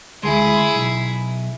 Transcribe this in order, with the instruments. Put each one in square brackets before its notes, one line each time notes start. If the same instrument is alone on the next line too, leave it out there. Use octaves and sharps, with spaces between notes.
[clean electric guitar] D2 G#3 [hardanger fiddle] E4 G#4
[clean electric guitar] B1